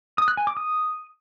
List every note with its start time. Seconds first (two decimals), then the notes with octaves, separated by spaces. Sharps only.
0.18 D#6
0.28 F#6
0.37 G#5
0.47 D6
0.57 D#6